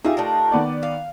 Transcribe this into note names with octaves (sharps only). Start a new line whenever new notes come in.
D#4 F4 G4 G#4 E5
A3 D4 A#4
D#3 B3 D5
F5